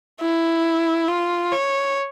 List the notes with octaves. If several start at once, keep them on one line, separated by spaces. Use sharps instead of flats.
E4
F4
C#5